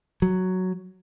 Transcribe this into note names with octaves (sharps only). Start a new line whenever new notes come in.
F#3